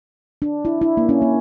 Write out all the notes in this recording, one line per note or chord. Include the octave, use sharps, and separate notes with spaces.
D4
E4
E4
A#3
C#4
A#3